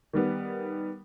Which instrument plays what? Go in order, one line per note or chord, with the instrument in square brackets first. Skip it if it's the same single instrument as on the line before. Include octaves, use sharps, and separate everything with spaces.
[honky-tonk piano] D#3 G3 B3